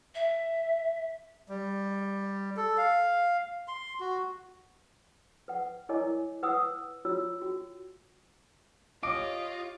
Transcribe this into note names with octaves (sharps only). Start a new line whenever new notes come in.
E5
G3
A4
F5
C6
F#4
B4 F#5
E4 A#4 C#5 D#5 G#5 D6
B4 F#5 D#6 E6
F4 F#4 C#5 E6
F#4
F4 G4 C#5 D#5 D6 D7